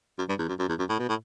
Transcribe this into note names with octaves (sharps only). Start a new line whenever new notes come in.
F#2
G2
E2
F#2
F#2
E2
F#2
A2
B2
A2